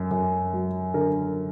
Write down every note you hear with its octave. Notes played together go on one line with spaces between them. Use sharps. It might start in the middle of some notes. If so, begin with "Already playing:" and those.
Already playing: F#2
F#2
F#3
D3 A#4